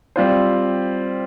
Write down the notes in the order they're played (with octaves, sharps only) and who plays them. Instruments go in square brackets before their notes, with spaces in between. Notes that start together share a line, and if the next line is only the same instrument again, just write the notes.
[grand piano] G3 C4 F4 C5